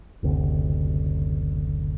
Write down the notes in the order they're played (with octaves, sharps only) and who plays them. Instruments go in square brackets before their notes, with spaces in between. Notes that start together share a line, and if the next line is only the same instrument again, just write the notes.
[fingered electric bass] F#1 D2 C3